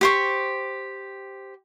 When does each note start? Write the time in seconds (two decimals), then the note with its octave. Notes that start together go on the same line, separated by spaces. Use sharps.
0.01 G4 C5 C#6